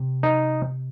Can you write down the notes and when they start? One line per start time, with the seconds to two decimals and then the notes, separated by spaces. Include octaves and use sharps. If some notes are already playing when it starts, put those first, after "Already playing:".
Already playing: C3
0.23 D#4